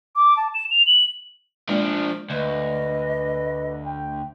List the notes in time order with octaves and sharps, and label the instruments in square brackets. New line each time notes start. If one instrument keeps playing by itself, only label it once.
[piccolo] D6
A5
E7
F7
F#7
[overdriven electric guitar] F3 D4 [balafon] G#3 A#3 D5
[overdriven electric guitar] D2 [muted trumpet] B4 [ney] D#5
[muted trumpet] G5